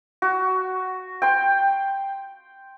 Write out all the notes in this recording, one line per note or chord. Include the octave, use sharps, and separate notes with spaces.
F#4
G5 C6